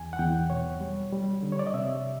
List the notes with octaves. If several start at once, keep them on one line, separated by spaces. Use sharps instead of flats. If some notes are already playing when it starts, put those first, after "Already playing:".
Already playing: E2 G#5
F#5
E2 G5
B2 C#5
G3
G3
D3
C#5
D5
D#5
C3 E5